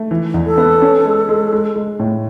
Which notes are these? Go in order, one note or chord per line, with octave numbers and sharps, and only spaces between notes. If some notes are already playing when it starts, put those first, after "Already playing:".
Already playing: A3
E3
E2
A4
B3
C#4
G#3
G#3
G#3
G#3
A2